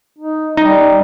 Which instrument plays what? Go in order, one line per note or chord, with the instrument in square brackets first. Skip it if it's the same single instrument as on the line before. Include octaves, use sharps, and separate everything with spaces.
[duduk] D#4
[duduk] G3 [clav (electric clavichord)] D#4